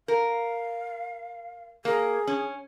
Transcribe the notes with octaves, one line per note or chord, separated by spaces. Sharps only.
A#4 F5
A#3 G#4
C#4